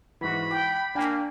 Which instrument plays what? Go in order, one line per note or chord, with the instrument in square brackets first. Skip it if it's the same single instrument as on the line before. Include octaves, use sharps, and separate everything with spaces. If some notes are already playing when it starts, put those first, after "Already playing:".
[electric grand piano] G#2 E3 [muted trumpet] F#4 [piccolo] B5
[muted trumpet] G5 [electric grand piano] D6
[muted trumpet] A#3 [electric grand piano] D4 G5 G#5